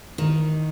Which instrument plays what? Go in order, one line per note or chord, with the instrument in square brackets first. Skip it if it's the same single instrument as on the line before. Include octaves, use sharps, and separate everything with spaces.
[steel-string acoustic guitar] D#3